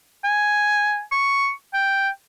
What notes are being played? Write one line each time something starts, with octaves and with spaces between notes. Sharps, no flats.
G#5
C#6
G5